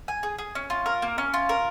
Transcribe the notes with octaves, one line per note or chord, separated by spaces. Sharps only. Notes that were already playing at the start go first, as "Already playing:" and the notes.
G#5
G#4
G#4
C#4
F4
A#4
A#3
C#4
F4
A#4